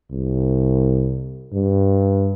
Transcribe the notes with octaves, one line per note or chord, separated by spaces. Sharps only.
C2
G2